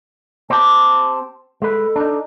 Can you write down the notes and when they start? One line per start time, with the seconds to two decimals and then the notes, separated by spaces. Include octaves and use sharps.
0.50 C4 G4 A5
1.62 G#3 A4 B4
1.96 D4 D#4